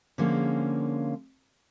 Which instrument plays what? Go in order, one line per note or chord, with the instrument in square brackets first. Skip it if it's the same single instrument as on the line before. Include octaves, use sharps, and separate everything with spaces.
[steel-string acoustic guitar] D3 F3 G#3 A#3 C#4